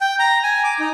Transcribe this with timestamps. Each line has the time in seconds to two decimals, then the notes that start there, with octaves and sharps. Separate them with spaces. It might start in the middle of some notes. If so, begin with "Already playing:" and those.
0.01 G5
0.19 A#5
0.43 G#5
0.64 D6
0.79 D#4